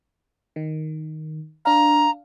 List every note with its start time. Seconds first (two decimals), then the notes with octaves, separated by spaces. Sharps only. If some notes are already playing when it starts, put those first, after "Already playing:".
0.56 D#3
1.65 D4 F5 A#5